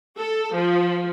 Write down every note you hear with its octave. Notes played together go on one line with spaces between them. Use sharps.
A4
F3